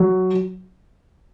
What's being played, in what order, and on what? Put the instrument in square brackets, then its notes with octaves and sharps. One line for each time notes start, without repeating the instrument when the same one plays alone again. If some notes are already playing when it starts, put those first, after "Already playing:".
Already playing: [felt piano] F#3